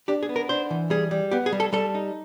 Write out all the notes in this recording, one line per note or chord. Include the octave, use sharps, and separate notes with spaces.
D4 G4
G#4
B3
A#4
D4 C5
E3
G3 G#4
G3
B3 G4
G#4
G3
A4
G3 A4
D#4